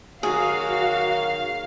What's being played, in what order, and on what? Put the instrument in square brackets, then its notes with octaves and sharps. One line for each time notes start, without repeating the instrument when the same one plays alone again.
[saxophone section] D#3 F#3 A#3 [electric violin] F#4 [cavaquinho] G#4 [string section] F5